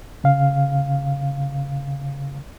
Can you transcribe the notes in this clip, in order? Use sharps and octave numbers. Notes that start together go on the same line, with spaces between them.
C#3 F5